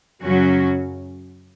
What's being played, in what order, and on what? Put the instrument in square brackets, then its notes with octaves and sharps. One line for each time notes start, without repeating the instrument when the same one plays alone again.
[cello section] F#2 C#3 F#3 C#4 F#4